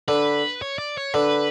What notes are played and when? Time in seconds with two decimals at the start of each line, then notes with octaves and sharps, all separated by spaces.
0.08 D3 B4
0.62 C#5
0.79 D5
0.97 C#5
1.14 D3 B4